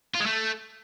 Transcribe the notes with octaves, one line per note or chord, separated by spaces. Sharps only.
F4
G#3
A3